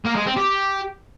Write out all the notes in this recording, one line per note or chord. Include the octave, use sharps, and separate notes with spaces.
A#3
G#3
C4
G4